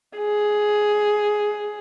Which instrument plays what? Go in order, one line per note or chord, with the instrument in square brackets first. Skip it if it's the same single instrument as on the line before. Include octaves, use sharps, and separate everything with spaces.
[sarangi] G#4